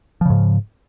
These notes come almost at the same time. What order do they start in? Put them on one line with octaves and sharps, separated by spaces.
F3 C#3 G#2